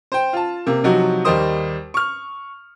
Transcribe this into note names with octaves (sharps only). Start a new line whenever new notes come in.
C5 G5
F4 A5
C3 A#3
C3 F3 F#3 D#4 F#4
D#2 G3 D#4 A#4 C5 D#6
C#6 F6